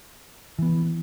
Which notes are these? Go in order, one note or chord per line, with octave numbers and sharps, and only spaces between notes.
E3 B3